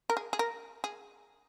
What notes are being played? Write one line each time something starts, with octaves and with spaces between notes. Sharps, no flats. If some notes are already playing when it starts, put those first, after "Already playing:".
A#4
G#4
G#4
A#4
G#4